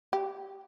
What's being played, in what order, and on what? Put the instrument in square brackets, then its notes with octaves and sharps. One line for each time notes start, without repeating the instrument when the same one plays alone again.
[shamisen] G4